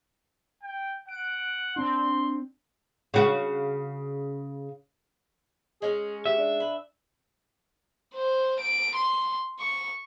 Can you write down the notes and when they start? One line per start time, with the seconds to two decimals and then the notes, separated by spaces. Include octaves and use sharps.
0.63 G5
1.09 F#5 D7
1.76 C4 D4 C6
3.14 C#3 F#4
5.82 G#3 C#4 G#4
6.26 G4 E5
6.38 D4
6.60 B4
8.14 C5
8.60 D7
8.96 C6
9.60 C#6